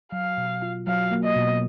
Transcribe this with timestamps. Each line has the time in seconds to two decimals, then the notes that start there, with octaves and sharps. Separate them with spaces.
0.12 F#3 F5
0.37 B2
0.62 F4
0.87 F#3 F5
1.11 A#3
1.24 D#5
1.36 B2